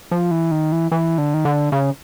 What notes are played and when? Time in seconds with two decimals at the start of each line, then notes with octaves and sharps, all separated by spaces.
0.11 F3
0.31 E3
0.51 D#3
0.72 E3
0.91 E3
1.18 D3
1.34 D#3
1.45 D3
1.72 C#3